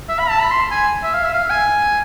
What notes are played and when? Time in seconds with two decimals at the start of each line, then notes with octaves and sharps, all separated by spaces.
0.09 E5
0.19 B5
0.30 A5
0.40 B5
0.51 C6
0.71 G#5
1.03 E5
1.13 F5
1.24 E5
1.34 F5
1.50 G#5